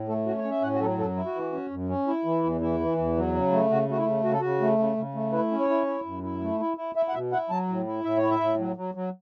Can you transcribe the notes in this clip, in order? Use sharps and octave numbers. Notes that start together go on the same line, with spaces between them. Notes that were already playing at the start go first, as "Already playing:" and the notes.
Already playing: A2
A3 A4
C#4 F#4
C#5
C#4
E5
A2 F#5
F#4
F#3 A4
F#2 A4
E4
F#4
E3
C#4
F#2
C#4
E4
E3
E2
E3 E4
E3
E2
F#3
C#3
A3
C#3 F#4
A3 F#4
E4
C#3
C#3 F#4
A4
C#3 F#4
A3
C#3
C#3
A3
E4 B4
C#4
C#5
E4
E4
F#2
E4
A3
E4
E4
E4 E5
F#5
B2 E5
E4 F#5
F#3 A5
A2
E4
A2 E5
C#5
E4
E5
A2
F#3
F#3
F#3